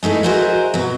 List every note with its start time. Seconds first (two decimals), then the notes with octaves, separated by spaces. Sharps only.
0.03 G#3 A3 D#4 E4
0.23 F#4 G#4 A#4 C5 D#5 E5
0.74 B2 F#3